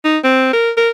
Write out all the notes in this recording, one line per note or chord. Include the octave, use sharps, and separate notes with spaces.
D#4
C4
A#4
A#4